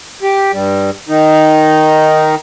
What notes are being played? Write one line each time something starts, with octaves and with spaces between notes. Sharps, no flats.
G4
G2 G3
D#3 D#4